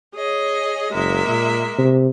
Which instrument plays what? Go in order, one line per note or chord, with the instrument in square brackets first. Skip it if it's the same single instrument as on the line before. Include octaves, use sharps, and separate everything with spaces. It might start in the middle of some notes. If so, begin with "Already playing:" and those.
[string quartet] G#4 C#5 D#5
[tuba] F#1 [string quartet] G#3 A#3 E5
[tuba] A#2
C3